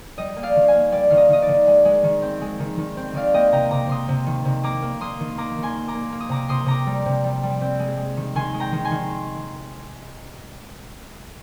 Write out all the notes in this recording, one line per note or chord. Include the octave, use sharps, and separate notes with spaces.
G3 D#5
A#3
D5 F5
D#3
F5 G#5
A#3
G3 D5
D#3 F5
D#5
D#3 D#5
D5
D#3
G#3
G#3
D#3
C4
G#3
D#3
D#3
C4
D#3 D5 F5
A#3 D#5 G5
C3 G5 A#5
C3 A#5 D6
C3 C6 D#6
C3
D#3
C3
A#3 A#5 D6
A#3
A#3 C6 D#6
D#3
A#3 A#5 D6
D#3
G#5 C6
A#3
A#5 D6
A#3
A#3
D#6
C3 A#5 D6
C3 C6 D#6
C3 A#5 D6
G3
C3
G3
G3
C4
G#3
G#3
D#3
D#3 G#5 C6
G#3
G5 A#5
D#3
G#5 C6
D#3